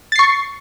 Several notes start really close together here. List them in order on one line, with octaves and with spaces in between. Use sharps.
A6 C7 C#6